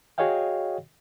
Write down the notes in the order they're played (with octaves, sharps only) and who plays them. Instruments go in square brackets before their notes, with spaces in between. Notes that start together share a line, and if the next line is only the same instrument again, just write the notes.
[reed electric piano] F#4 G#4 C#5 D#5 F5 G5